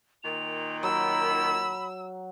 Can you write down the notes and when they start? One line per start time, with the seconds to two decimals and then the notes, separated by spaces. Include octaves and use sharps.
0.23 A#2 D#3 F7
0.83 F#3 A#5 B5 E6